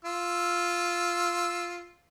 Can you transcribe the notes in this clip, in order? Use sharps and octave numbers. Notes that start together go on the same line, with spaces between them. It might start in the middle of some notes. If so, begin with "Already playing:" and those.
F4 E6